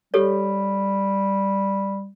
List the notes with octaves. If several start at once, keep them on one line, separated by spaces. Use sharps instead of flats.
G3 G4 A4 C#5